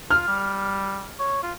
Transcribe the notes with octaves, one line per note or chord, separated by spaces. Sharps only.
F4 F6
G3
C#5
F4